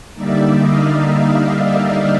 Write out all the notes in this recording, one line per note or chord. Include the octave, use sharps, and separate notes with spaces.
D3 G3 A#3 D#4 D5 E5
D#5 F5
D5 E5